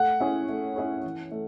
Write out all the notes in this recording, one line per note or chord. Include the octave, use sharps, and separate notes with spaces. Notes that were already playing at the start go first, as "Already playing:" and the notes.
Already playing: A3 F#5
C#4 E4 G#4 C#5
A3
C#4 E4 G#4 C#5
E3
A3